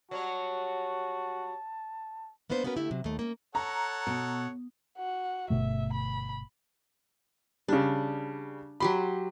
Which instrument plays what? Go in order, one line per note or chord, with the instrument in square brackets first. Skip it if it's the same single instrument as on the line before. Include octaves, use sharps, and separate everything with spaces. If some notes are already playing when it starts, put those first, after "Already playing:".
[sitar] F#3 G3 C#5 [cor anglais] F#4 [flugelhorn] A5
[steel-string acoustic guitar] A#3 B3 D4 B4 C5
B3 C#4 F#4 A#4 B4
D3 A3 E4 G4
C3 F#3
D#2 A3
A#3 C#4
[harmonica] A4 C#5 F#5 [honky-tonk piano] A#5
[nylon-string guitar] B2
[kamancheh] F#4 F#5
[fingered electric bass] G1 B2 A3 [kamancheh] E5
[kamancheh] B5
[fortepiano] C#3 G3 [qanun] D4
[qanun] F#3 G4 C6 [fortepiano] B5